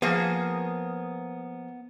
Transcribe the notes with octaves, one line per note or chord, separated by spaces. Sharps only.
F3 A#3 B3 G#4